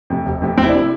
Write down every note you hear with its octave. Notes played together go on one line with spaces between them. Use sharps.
F2 C3
F1
F2 C3
F1 C4
E4
D4
C3 E4